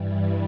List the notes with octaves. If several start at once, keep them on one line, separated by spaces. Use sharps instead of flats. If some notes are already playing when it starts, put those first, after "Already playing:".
Already playing: G2 E3 G3